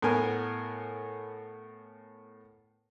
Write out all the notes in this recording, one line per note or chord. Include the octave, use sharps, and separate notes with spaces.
A2 B3 A#4 G#5